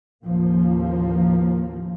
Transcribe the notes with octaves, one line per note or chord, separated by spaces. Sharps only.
A1 D#2 F3 A#3